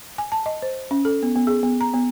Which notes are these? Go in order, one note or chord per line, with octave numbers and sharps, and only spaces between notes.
G#5
A5
D#5
C5
C#4
A4
B3
B3
G#4
B3
A#5
B3